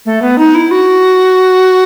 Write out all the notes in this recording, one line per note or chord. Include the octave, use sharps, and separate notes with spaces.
A3
B3
D#4
E4
F#4